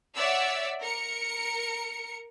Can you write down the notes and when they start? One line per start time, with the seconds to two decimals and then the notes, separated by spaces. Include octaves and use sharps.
0.16 C#5 D5 E5 F#5 E6
0.80 A#4 C#7